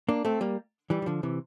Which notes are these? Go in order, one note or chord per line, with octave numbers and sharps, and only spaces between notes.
A#3 D4
A3 C4
G3 A#3
E3 G3
E3
D3 F3
C3 E3